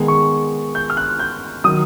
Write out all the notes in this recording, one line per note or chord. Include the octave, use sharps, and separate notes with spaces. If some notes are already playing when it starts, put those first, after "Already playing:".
Already playing: D#3 G#3 B3
C#6
G6
F6
F#6
G6
D#3 F#3 D#6